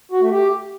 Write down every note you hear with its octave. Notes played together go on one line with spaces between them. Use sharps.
F#4
A3
G4